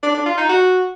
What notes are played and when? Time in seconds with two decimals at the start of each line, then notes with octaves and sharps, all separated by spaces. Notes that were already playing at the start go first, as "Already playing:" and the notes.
0.03 D4
0.14 D4
0.26 F4
0.37 D#4
0.49 F#4